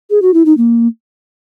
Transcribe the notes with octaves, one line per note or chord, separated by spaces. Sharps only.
G#4
F#4
E4
D#4
A#3